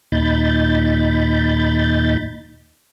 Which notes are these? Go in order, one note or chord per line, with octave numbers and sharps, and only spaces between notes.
D#2 A#2 D#4 B5 G6 A6